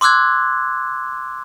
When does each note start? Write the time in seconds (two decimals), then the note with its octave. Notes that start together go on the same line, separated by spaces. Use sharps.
0.01 C6 D6 E6 F#6 G#6